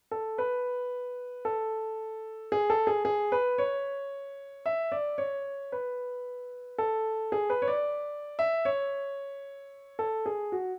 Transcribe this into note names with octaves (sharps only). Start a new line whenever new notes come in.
A4
B4
A4
G#4
A4
G#4
G#4
B4
C#5
E5
D5
C#5
B4
A4
G#4
B4
C#5
D5
E5
C#5
A4
G#4
F#4